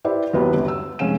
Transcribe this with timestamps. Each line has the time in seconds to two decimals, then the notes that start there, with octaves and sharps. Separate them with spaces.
0.05 E4 G4 B4 C5 D5
0.34 D#2 F#3 B3 E4 B4
0.54 G1 D3
0.68 E6
0.99 F1 G#3 C#4 F5 E7